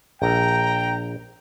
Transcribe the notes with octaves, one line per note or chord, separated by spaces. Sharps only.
A#1 G5 A#5